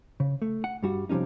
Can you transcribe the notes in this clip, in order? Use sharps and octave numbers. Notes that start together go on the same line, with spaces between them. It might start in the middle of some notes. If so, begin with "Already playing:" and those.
C#3
A3
F#5
G2 G3 F#4
C3 F3 G3 C#4 D#4